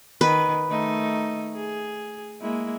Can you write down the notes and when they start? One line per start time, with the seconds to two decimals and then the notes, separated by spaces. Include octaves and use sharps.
0.21 D#3 B4
0.67 D#3 A3 D#4
1.54 G#4
2.41 G#3 A#3 E4